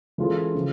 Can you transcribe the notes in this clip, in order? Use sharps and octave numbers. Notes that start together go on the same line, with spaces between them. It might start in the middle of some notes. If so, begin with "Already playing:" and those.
E3 G#3 C#4 F4 A4
C#3 F3